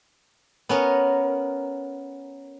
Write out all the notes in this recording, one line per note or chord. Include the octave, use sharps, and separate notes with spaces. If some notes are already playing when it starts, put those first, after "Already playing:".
B3 C#4 A#4